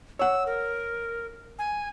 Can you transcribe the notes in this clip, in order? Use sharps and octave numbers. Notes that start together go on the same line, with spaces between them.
C#5 F#5 E6
A#4
G#5